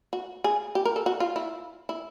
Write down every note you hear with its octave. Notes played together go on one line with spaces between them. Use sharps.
F#4
G#4
G4
A#4
A4
F#4
F4
E4
E4